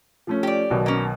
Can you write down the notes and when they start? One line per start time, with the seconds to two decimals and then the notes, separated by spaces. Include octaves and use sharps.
0.27 F3 A3 C#4
0.43 G4 D5
0.70 B1 B2 D#3
0.86 A#3 C#4